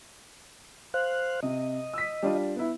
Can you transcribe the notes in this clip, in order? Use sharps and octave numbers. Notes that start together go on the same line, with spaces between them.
C5 F5 F#6
C3 D#5
E6 B6
G3 D4 F4
B3 E4